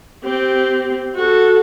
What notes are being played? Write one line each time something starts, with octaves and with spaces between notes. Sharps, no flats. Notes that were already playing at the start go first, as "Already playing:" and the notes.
C4 G4
F#4 A4